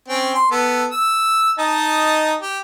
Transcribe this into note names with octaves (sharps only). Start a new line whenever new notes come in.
C4 C#4
C6
B3 A4
E6
D#4 D#5 A5
G4